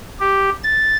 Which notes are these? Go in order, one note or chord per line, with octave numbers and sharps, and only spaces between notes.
G4
A6